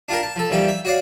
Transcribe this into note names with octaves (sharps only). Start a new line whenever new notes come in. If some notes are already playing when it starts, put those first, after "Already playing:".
D4 F4 G4 A#4
A5
F3 A4
D#2 E3 F3 G3 G5
E5
F#4 C#5 D5 F5